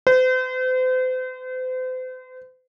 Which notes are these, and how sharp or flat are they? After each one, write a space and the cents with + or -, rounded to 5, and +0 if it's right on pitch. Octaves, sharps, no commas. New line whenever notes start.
C5 -40